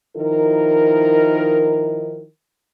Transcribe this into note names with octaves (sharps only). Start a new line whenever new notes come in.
D#3 F3 D#4 E4 A#4